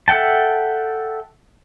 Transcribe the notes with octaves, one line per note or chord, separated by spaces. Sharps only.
A4 E5 F#5 G5 A5